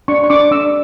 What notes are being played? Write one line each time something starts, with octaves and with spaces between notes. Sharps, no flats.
D4 C#6
C#6
D4 D6
D4 E6